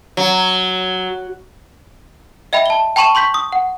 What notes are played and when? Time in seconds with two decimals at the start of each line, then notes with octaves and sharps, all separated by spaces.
0.17 F#3
2.53 D#5 E5 G5 B5
2.66 A5 G7
2.96 G5 A5 B5 C#6 D#7 E7
3.15 C6 C#6 G6 B6
3.34 D#6
3.52 F#5